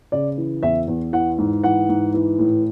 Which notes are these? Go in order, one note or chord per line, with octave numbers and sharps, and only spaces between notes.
C#3 D5
E3
E2 E5
E2
E3 F#5
G#2
E3 F#5
G#2
E3
A2